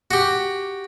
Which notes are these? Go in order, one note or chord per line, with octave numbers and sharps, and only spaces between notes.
F#4 G4